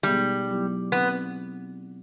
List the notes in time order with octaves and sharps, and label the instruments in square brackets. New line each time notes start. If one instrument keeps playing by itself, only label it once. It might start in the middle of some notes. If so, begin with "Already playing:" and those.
[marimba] B2 G#3 B3 D#4 G#4 [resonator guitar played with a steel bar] G3
[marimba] F#3 B3 E4 G4
[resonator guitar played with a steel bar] B3 [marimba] C4